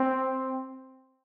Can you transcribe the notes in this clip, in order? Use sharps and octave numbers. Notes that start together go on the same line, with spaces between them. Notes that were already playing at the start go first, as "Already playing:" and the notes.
Already playing: C4